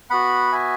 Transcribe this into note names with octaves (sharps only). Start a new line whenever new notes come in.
B3 F#4 F#5 B5
E5 G#5